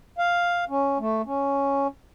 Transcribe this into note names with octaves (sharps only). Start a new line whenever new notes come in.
F5
C#4
A3
C#4